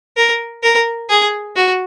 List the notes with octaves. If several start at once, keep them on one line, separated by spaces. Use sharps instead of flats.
A#4
A#4
G#4
F#4